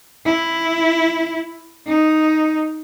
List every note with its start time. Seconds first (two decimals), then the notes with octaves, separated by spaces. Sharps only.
0.25 E4
1.87 D#4